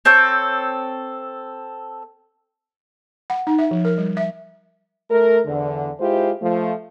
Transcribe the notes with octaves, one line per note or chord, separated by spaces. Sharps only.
C4 A4 C#5 G6
F#5
D#4
E5
F3
A#4
G3
E5
A3 A#4
E2 D3
G#3 E4 F4 G4 C5
F3 A3